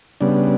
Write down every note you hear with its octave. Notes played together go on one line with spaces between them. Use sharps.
C#3 G3 B3 D4